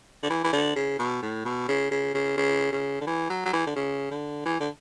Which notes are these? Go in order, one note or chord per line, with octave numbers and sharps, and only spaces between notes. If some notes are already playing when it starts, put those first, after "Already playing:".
D3
E3
E3
D3
C#3
B2
A2
B2
C#3
C#3
C#3
C#3
C#3
D3
E3
F#3
F#3
E3
D3
C#3
D3
E3
D3